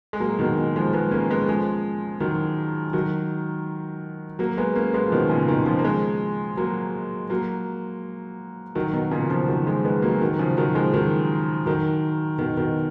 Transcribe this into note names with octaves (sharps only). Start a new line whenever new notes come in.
G#3
F#3 A#3
B2 D#3
B2
F3 G#3
G#3 B3
A#3 C#4
G#3 B3
F3 G#3
D#3 F#3
D#3 F#3
F#3 A#3
G#3 B3
A#3 C#4
G#3 B3
F3
B2 D#3
A#2 C#3
B2 D#3
C#3 F3
A#3
F3 G#3
F#3 A#3
F#3 A#3
D#3 F#3
B2 D#3
A#2 C#3
C#3 F3
D#3 F#3
F3 G#3
G#3 B3
F#3 A#3
D#3 F#3
C#3 F3
D#3 F#3
F3 G#3
D#3 F#3
D#3 F#3
B2 D#3
B2 D#3